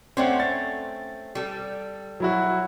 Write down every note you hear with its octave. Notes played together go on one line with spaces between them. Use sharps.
A3 C4 C#4 C5 D5 F#5
A6
G3 A4
F#3 E4 F#4